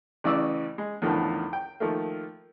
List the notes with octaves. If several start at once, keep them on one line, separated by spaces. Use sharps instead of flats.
A1 C#3 E3 D5 E6
G#3
E2 A2 D3 D#3 F3
G5
D#3 F3 A3 A#3